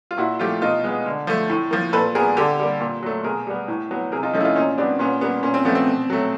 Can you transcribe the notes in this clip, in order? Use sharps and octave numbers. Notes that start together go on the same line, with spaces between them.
F4
A#2 E4 F#4
F3 A3 F4 G4
B2 D#4 F4
G#3 B3
D3
F3 A3
A2
F3 A#3
A#2 A4 B4
G3 B3 G#4 A#4
D3 G4 A4
G3 A#3
A#2
F#3 A3
B2 G#4 A#4
G3 B3
A2
F#3 B3
C3 G#4 A#4
D#4 F4
F3 A3 C#4 D#4
E4
D#4 F4
A#2 C#4 D#4
G3 B3 C4 D4
A#2 B3 C#4
G3 A#3 B3
A#2 C#4
C4
F3 A3 B3
C4
B2
F#3 A3